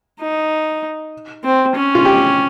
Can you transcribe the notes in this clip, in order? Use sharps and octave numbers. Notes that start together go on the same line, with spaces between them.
D#4
C4
C#4
F4
G4